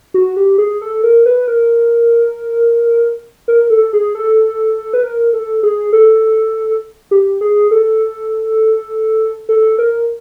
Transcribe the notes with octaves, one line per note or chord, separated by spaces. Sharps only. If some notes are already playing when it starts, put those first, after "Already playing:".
F#4
G4
G#4
A4
A#4
B4
A#4
A#4
A4
G#4
A4
B4
A#4
A4
G#4
A4
G4
G#4
A4
A4
A#4